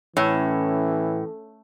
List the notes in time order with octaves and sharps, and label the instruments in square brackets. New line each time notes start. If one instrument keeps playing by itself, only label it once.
[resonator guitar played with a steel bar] A2 [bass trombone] E3 [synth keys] C#4